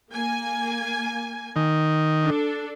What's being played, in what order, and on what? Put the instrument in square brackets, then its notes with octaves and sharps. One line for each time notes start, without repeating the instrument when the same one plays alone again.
[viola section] A#3 G#5
[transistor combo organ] D#3
[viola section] D4 A4